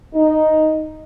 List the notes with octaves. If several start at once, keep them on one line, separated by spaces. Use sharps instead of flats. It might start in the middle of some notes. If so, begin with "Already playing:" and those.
D#4